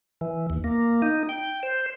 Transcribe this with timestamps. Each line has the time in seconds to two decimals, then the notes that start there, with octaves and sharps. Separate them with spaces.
0.21 E3
0.50 D#2
0.64 A#3
1.02 D#4
1.29 G5
1.63 C5